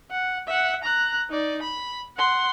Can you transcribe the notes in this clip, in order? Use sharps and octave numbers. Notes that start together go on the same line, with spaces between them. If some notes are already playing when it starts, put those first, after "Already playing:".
F#5
E5 F#5
A#5 F#6
D#4 D5
B5
F#5 C6